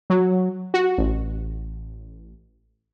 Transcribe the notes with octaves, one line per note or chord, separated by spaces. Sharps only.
F#3
F#4
A1